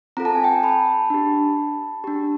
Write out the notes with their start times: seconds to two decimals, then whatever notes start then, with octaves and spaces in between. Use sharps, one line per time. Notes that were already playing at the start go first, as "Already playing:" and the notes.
0.17 C4 F4 A4 A#5
0.25 A5
0.35 G#5
0.43 G5 A5
0.63 A5 B5
1.10 D4 G4
2.04 D4 G4